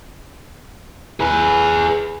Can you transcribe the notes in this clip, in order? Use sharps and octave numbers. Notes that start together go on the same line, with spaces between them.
G#4 B4